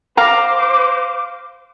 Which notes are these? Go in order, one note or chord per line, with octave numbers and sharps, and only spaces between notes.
C5 F5 A#5 D6